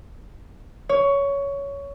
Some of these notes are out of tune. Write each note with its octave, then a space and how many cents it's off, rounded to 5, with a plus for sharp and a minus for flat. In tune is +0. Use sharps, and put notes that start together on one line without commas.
C#5 +15